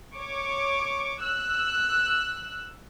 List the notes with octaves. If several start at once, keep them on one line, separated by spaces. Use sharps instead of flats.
C#5 C#6 D6
E6 F#6